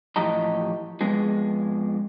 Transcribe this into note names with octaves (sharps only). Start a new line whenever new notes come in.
A2 E3 F3 G4 D#5 A#5
F2 G#3 B3 G#4